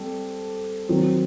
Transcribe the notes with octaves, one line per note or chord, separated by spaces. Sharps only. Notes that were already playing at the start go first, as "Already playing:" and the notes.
Already playing: G3 C4 A4
D#3 F#3 C4